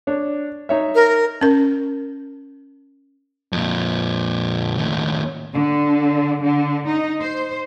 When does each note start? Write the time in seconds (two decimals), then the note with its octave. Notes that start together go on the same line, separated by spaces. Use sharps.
0.07 D4 C#5
0.69 D#4 C#5 E5
0.95 A#4
1.41 C#4 A#4
3.53 F2 A#2
4.77 D#2 A2
5.54 D3
6.42 D3
6.87 D#4
7.19 C5